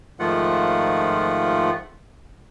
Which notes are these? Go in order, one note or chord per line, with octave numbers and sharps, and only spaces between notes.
G#2 D#3 F3 A3 F4 F#5